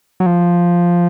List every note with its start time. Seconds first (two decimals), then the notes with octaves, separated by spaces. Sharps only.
0.20 F#3
0.26 F3